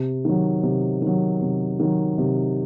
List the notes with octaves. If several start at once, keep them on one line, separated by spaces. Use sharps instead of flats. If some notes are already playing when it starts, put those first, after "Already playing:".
Already playing: C3
D#3 F#3
C3
D#3 F#3
C3
D#3 F#3
C3